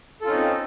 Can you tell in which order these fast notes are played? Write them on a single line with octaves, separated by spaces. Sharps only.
A4 F4 C#4 D#4 C4